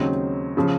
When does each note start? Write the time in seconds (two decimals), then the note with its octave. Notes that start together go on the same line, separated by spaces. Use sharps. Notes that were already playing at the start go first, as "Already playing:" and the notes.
Already playing: D#2 C#3 F#3 C4 D#4
0.57 C#3 F3